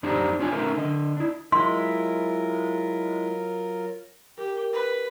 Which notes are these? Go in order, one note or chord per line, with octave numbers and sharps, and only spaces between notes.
F#2 D4 D#4 G4 C5
D4 F4 C#5 F5 G#5
A3 C#4 D#4 A#4 E5
D3 D#5
D4 E4
F#3 G#3 E4 F4 A#4 C6
G4 A#4
B4